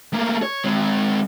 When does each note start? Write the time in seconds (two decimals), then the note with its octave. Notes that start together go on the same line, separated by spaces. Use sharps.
0.14 A3 A#3
0.42 C#5
0.64 G#3 C4